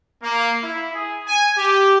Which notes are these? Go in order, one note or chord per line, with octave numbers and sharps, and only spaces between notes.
A#3
E4
G#4
G#5
G4